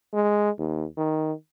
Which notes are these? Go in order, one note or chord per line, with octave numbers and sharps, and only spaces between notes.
G#3
D#2
D#3